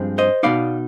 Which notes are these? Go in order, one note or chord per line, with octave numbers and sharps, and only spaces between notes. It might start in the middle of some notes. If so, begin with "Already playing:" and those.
Already playing: G2 F3 G#3 C4
C5 D#5
B2 G#3 B3 D#4 D5 F5